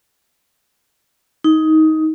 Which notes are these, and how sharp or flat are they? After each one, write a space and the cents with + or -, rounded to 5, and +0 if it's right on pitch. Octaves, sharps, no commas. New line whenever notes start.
D#4 +15